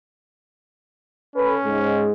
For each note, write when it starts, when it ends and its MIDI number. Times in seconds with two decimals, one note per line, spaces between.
1.36 2.07 61
1.36 1.55 69
1.36 1.55 71
1.65 2.12 44
1.65 2.12 56